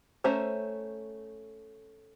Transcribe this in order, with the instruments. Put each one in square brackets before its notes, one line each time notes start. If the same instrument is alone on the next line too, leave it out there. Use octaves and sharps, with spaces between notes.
[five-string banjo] A3 C#4 C5 E5 A#5